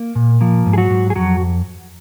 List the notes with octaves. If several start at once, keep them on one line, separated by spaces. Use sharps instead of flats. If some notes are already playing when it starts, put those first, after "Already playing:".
Already playing: A#3
A#2
F3 A#3
G#2
G#4
F#3 F#4
G#2
G#4
F2 F#3 F#4